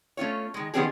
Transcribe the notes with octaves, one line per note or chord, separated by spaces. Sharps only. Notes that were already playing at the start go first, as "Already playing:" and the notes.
A3 C#4 F4 C#5
D#3 G#3
D#3 F3 B3 C#4 G4 G#4